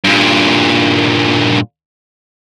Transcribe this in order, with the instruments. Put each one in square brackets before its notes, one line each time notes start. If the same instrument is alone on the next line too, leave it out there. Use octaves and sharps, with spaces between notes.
[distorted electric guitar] G2 A#2